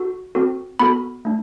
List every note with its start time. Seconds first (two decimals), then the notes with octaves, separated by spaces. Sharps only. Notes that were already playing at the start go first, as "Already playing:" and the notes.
Already playing: F#4 A4
0.35 C4 F#4 A4
0.79 B3 F#4 A4 B5
1.25 A3 D4